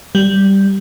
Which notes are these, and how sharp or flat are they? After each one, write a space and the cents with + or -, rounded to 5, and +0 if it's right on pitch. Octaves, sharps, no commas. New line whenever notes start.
G3 -5